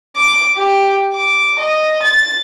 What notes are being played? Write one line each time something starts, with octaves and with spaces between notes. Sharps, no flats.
D6
G4
D6
D#5
A6